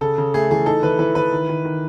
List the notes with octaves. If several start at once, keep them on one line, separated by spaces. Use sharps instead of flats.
C#3 A4
C#3
A3 G#4
E3 G#4
D#4 A4
E3 B4
E3 B4
E3 B4
D#3
D#3
D#3